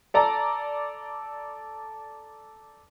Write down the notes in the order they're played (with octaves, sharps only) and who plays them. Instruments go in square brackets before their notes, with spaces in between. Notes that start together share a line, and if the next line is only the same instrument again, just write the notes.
[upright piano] A4 D5 A#5